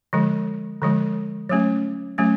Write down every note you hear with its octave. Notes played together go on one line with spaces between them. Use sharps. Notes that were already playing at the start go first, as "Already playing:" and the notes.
D3 F3 G#3
D3 F3 G#3
F#3 A3 C#4
F#3 A3 C#4